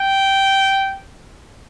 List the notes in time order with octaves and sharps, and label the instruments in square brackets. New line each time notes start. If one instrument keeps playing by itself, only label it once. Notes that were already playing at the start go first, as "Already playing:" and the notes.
Already playing: [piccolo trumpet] G5